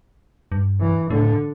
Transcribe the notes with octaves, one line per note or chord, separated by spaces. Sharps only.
G2
E3
A2 D3